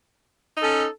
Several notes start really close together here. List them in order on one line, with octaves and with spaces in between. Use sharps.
D#4 A4 C#4